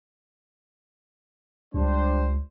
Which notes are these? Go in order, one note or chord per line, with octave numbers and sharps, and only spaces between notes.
C#2 G3 D4 C5